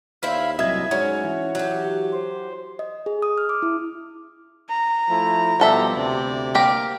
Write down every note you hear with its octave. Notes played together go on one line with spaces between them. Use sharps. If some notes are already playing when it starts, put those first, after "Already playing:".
D#2 E4 C5 E5 F5 B5
C2 F#3 A#3 D#5 E5 G#6
G#2 C#4 F#4 C#5
E3
F#3 G4
C5
D#5
G#4
D#6
F6
D6
E4
A#5
F3 A3 E4
B2 F3 G3 B3 A4 E5
D2 C3 D5
A#3 G4 A#4